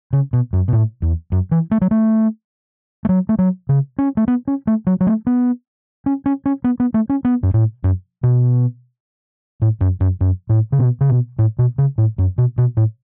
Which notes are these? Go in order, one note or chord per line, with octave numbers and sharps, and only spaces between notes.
C#3
B2
F#2
B2
A2
E2
F#2
E3
A3
F#3
A3
A3
F#3
A3
F#3
C#3
C#4
A3
B3
C#4
A3
F#3
F#3
A3
B3
C#4
C#4
C#4
B3
B3
A3
C#4
B3
F#2
A2
F#2
B2
A2
F#2
F#2
F#2
A2
C#3
B2
C#3
B2
A2
B2
C#3
A2
F#2
B2
B2
A2